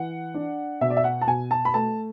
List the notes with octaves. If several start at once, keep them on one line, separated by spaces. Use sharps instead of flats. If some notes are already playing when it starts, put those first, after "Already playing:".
Already playing: E3 F#5
D4
B2 E5
D5
E5
F#5
A5
B2 G#5
A5
B5
A3 A5